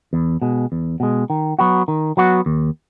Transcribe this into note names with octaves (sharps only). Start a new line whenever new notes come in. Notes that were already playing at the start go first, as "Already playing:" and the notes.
E2
B2 G#3
E2
B2 G#3
D#3
F#3 B3 F#4
D#3
F#3 B3 F#4
D#2